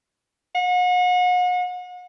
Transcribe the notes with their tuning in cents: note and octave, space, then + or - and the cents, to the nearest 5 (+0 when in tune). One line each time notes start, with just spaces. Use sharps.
F#5 -40